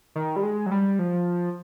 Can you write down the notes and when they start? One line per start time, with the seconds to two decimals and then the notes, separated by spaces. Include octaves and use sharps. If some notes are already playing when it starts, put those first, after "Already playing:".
0.16 D#3
0.36 G3
0.43 G#3
0.66 F#3
0.71 G3
0.99 F3